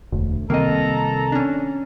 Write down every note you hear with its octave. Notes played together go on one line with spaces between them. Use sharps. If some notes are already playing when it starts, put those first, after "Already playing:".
E1 D2
C2 D#3 A#3 C4 A4 D#5 A5 A#5
C#4 D4